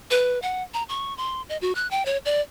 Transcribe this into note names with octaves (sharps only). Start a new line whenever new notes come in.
B4
F#5
A#5
C#6
C6
D#5
F#4
F#6
G5
C#5
D5